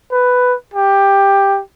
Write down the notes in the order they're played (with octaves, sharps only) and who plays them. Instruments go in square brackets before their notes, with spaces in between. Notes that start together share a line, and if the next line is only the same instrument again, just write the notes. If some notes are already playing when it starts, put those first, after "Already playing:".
[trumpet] B4
G4